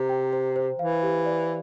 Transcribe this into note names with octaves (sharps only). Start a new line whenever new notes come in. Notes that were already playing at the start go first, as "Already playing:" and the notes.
Already playing: C3 C5 A#5
G5
C5
C5
E3 F5
G4
D5